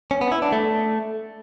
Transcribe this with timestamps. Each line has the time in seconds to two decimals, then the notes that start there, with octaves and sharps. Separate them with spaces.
0.11 C#4
0.21 B3
0.32 E4
0.42 D4
0.52 A3